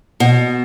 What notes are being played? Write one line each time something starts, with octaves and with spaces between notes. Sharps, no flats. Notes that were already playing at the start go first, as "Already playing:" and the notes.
B2